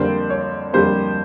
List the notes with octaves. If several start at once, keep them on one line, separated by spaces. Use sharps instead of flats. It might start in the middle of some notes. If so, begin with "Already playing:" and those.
Already playing: F2 D3 G3 A#3 C5 D5
C#5
F2 D3 G3 A#3 C5